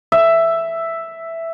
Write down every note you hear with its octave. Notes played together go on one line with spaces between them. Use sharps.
E5